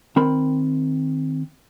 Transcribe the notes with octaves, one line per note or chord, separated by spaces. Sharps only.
D#3 C4 A#4 B5